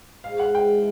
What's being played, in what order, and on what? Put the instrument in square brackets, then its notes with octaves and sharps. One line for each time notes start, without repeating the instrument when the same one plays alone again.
[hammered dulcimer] G#2 [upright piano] F5
[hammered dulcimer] E3 G#3 [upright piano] F#5
[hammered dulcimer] G#2 [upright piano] G5
[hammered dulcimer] E3 G#3